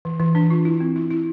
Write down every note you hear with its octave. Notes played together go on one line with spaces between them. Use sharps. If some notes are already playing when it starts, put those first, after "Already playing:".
E3
E3
D4
F4
E4
C4
E4
E4